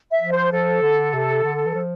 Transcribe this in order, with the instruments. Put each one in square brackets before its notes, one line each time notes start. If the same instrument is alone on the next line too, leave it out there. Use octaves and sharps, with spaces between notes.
[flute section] E5
[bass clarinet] F3
[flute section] C5
[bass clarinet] F3 [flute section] A4
[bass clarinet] D3
C3
D3
E3
F3